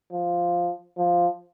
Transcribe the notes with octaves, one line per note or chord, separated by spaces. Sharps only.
F3
F3